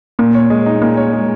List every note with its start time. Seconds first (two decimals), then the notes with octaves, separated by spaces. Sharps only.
0.19 A#2 A#3
0.35 C#5
0.50 G#3
0.66 D#4
0.82 A#2 A#3
0.97 C#5
1.13 G#3